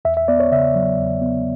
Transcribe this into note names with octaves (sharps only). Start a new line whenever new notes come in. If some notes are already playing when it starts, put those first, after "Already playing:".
E2 E5
E5
B3 D5
C#5
C#3 E5
F#3
E2
B3